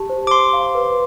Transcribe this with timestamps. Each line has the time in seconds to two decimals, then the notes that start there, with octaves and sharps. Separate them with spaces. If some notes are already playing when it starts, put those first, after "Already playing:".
Already playing: G4 A5
0.10 C5
0.27 D6
0.31 C5 C6
0.53 F5
0.75 B4